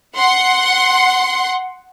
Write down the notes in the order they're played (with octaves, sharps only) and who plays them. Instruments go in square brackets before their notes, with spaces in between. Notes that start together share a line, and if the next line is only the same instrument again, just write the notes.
[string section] F#5 C6